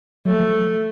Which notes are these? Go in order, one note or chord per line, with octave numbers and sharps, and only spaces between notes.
F#3 A3
F3